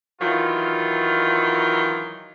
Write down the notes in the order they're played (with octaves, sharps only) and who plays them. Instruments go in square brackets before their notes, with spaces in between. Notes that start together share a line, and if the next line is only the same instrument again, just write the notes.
[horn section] D#3 E3 F#3 F4